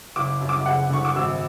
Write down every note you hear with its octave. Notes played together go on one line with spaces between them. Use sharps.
F#1 D6
F#2
D6
F#1 F#5
D3 C#6
D6
G#1 E6